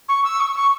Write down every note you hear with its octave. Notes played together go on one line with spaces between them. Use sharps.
C#6
E6
C#6
C#6